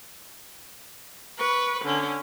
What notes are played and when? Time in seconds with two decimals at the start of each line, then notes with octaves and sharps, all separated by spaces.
1.38 B4 C#6
1.84 D3 C#4